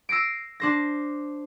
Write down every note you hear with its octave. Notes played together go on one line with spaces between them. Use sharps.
E6 A#6 C7 D7
D4 C5 A#6